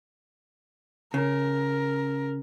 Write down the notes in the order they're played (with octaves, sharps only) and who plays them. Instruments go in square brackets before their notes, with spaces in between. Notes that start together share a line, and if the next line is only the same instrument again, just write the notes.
[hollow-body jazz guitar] C#3 [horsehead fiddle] A#4